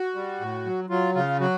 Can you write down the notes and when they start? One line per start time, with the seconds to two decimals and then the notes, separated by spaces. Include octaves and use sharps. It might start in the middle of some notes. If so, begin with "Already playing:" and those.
Already playing: F#4
0.15 G3
0.40 A2
0.66 F#3
0.89 F#3 F4
1.15 C#3 F4
1.40 F#3 F#4